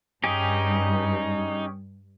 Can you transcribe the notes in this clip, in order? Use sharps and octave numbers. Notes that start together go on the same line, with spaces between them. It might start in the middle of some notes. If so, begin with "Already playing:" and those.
G2 C#4 D#4 G4 G#4